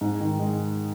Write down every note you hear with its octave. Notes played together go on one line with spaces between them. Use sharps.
G#2
D#3
G#3